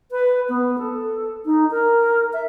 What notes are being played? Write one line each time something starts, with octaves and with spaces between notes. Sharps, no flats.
B4
B3
A4
D#4
A#4
E5